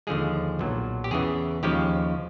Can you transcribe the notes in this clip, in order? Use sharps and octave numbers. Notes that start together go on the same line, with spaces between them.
D#2 D3 F3 G#3 G#4
B1 A#2 F#3
G4
E2 C#3 E3 G#4
D#2 C#3 F3 G#3 G4